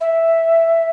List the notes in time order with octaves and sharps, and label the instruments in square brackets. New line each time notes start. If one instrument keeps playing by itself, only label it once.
[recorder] E5